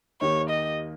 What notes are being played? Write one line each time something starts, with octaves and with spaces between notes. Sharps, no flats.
D#2 D#3 A#3 D#4 G4 C#5
D#5